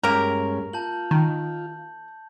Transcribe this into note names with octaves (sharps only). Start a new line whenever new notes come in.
G2 G#3 A#3 C#4 G4 A#4
F4 A5 G6 F#7
D#3